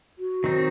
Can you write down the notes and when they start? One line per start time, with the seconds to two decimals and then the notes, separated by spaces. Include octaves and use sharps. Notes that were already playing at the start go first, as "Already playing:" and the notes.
0.19 F#4
0.44 D#3 F#3 C4 D#4